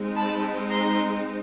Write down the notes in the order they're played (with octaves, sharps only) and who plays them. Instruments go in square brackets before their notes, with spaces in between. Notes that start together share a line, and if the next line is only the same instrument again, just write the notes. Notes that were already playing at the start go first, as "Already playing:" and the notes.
Already playing: [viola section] G#3 C4 D#4
A5 B5
A#5 C6